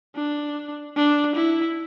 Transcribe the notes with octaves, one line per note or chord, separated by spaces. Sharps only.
D4
D4
E4